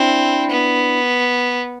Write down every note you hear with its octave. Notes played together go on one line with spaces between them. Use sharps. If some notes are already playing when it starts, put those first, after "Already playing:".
Already playing: C4 D4 E4
B3